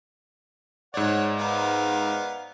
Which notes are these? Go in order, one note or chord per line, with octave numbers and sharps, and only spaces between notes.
G#2 C#5 D5 F#5
B3 A#4 F5